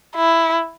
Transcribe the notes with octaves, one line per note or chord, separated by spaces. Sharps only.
E4